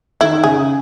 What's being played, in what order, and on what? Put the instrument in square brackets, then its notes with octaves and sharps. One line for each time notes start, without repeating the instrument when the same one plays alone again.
[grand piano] D#3 [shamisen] E4
[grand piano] C#3 [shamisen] G#4